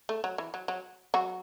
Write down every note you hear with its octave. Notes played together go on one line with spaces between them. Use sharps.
A3
F#3
E3
F#3
F#3
F#3 F#4